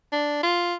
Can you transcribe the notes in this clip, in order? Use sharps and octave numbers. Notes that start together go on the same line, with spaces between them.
D4
F4